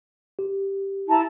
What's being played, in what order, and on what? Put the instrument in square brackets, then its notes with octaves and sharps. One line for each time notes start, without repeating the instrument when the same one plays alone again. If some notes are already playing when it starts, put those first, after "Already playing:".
[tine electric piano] G4
[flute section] E4 A5 A#5